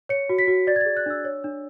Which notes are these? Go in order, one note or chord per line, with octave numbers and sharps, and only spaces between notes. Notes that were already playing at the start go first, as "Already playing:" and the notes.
C#5 C#7
F#4
B6
F#4
D5 A6
G#6
A6
G#4
F#6
D4 E6
C#5
D4